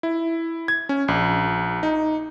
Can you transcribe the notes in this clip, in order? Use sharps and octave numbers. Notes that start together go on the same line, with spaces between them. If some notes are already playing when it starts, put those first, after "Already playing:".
E4
G#6
C#4
A#1
D#4